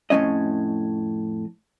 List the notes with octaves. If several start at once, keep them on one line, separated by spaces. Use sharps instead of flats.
F2 A2 C#3 E3 C#4 D#5